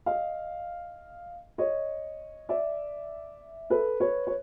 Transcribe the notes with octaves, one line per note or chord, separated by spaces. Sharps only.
D#5 F5
C#5 D#5
D5 E5
A4 B4
B4 C#5
C#5